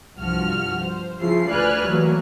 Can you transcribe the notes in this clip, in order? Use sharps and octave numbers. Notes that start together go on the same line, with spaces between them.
C2 G2 F3 F#4 F6
C5
C#3 F3 E4 C7
D2 B4 D5 G#5 F6 F#6
E3 F#3 A3 A#3